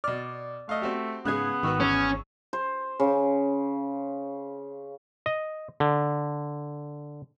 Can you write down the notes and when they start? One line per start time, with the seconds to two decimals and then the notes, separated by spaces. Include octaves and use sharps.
0.04 B2 D5 F6
0.69 A3 D#5 F5
0.82 C4 F#4 G4
1.25 G#2 C#3 B3 G#4 F#5 G#6
1.63 G#1 D#3 F#4 B4 C#6 E6
1.80 E2 C#4
2.53 C5
3.00 C#3
5.26 D#5
5.80 D3